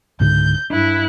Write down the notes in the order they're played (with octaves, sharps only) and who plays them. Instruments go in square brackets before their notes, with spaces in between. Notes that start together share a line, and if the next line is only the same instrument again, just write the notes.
[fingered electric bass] C#2 G#2 D3 [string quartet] G6
[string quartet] G2 E4 F#6 [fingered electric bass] D4